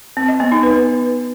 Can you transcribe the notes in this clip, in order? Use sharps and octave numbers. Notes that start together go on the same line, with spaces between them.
C4
D#5
B3
D#4
B4